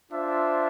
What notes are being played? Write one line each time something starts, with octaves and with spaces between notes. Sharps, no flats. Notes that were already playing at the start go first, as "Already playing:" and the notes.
D4 F4 C5 E5